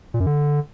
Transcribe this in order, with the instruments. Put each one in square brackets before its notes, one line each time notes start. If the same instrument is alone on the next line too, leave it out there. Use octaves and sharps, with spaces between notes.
[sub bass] A#2
F#2
D3